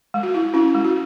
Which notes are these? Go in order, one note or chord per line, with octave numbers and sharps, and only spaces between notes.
G#3
F#4
E4
C#4 E4
G#3
F#4